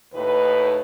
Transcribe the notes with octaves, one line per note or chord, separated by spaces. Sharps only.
D#2 A2 D#4 B4